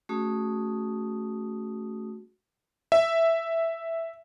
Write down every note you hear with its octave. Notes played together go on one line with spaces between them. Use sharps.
A3 C#4 F#4 G#4 D#6
E5